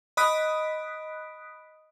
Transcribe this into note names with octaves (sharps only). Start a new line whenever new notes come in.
D#5 B5 D#6 F#6 B6 D7